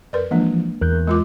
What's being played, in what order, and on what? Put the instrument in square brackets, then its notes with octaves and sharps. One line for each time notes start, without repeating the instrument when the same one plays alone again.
[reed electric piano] F2 [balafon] A#4 B4 D5
[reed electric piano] E3 F3 [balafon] G#3 A#3 D4
[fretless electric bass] E2 [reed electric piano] A#4 F#6 G6
[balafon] G#3 F4 D6